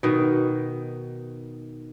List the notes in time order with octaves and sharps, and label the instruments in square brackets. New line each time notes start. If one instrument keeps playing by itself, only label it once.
[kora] B2 D#3